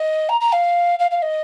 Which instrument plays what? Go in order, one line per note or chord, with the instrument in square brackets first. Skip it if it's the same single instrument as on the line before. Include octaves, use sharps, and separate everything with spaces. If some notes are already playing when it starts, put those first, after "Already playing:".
Already playing: [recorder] D#5
A#5
A#5
F5
F5
F5
D#5